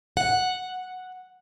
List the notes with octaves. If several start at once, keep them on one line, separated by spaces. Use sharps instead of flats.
F#5